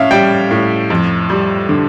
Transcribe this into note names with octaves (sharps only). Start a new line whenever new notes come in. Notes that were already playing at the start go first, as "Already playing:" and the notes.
Already playing: A2 C#4 E5 F5
G3 G5
A2
F2
G3
D3